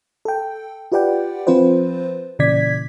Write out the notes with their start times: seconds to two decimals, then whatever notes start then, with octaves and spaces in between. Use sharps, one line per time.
0.25 A4 G5
0.92 F4 G4 B4 D5 F#5 G5
1.47 F3 C4 F4 B4 C5
2.39 A#2 C#3 E3 D5 G#6 B6